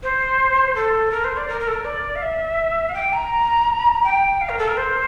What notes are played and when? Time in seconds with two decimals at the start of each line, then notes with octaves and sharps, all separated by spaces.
0.03 C5
0.75 A4
1.11 A#4
1.24 C5
1.37 D5
1.48 A#4
1.60 A#4
1.67 A4
1.73 A#4
1.85 D5
2.16 F5
2.22 E5
2.89 F5
2.94 G5
3.13 A#5
4.04 G5
4.41 F5
4.49 A#4
4.59 A4
4.68 A#4
4.77 C5